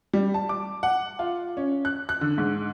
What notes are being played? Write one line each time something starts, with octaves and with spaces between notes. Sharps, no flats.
G3
A5
D6
F#5
F4
C#4
F#6
F#6
D3
G#2